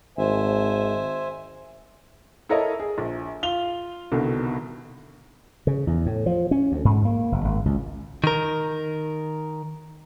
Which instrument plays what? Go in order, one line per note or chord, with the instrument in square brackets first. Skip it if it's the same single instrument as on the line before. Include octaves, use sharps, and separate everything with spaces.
[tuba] G#1 [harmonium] C5 E5 G#5
[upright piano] E4 A4 A#4 C#5 D#5 A#5
G#4
A#1
F4 F7 G7
C2 B2 D3 D#3
[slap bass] C#3
E2
A2
F3
C#4
D2
G#2
A#3
F#1
G#1
C#2
[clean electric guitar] D#3 A#4